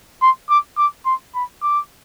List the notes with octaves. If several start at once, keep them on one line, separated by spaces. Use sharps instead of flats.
C6
D6
D6
C6
B5
D6